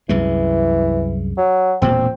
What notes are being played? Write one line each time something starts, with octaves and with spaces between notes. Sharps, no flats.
C2 F#2 E3 G#3
F#3
E1 A#2 C4